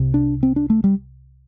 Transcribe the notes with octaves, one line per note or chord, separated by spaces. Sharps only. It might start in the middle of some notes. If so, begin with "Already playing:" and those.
Already playing: C2 C3
D4
C4
D4
A3
G3